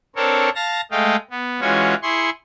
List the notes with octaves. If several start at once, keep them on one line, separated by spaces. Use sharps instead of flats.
C4 D4 A4 A#4 C#5
F5 A5 A#6
G#3 A3 D#5 F5 G5
B3
E3 G#3 C#4 F4 F#4 C#5
E4 G#4 C6 C#6